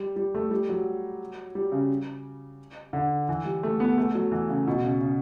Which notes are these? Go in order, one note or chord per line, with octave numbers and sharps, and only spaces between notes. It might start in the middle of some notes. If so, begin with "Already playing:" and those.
Already playing: G3
G3
A3
G3
F#3
G3
C#3
D3
E3
G3
A3
B3
A3
F#3
E3
C#3
B2
C#3
C#3